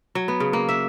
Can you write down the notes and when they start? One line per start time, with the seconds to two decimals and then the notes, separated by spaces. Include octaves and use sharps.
0.15 F#3
0.28 B3
0.40 C#3
0.53 A#3
0.69 E5